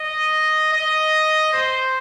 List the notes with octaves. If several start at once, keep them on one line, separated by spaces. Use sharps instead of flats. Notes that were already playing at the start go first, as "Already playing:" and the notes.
Already playing: D#5
D#5
C5